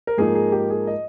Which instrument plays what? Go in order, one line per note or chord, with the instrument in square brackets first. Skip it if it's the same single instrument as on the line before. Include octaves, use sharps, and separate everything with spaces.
[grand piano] A#4
G#2 F3 A#3 D#4 G#4
G#4
G4
G#4
D#5